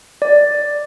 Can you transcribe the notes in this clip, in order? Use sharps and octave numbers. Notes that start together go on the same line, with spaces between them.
D5